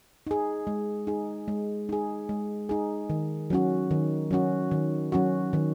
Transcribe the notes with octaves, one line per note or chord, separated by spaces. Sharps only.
D#4 G#4
G#3
D#4 G#4
G#3
D#4 G#4
G#3
D#4 G#4
D#3
F#3 C#4 F#4
D#3
F#3 C#4 F#4
D#3
F#3 C#4 F#4
D#3